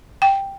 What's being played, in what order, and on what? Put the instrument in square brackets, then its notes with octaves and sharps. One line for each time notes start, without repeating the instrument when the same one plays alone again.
[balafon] G5